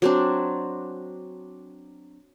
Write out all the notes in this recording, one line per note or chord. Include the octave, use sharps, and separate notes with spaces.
F#3 C4 D4